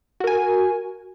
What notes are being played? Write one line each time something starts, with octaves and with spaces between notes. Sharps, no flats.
F#4 A#4 G#5